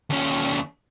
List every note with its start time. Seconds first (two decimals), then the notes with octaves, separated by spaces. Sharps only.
0.10 D#2 C#4